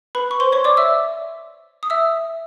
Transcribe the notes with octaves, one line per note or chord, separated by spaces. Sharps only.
B4 B5
C#6
C5 C6
C#5 C#6
D5 D6
E5 E6
D#6
E5 E6